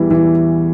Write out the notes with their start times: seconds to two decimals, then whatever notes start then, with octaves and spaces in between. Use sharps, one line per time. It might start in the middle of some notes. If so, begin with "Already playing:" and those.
Already playing: E2 E3 G3
0.11 E3